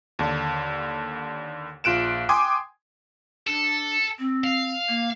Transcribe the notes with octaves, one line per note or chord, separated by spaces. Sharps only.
D#2 D3
A#1 F4 F#6 D7 E7
G5 G#5 C6 D6 D#6 G#6
D4 A4
C4
F5
A#3